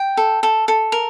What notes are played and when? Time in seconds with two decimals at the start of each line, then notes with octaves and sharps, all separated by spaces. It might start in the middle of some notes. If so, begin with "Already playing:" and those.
Already playing: G5
0.17 A4
0.43 A4
0.68 A4
0.92 A#4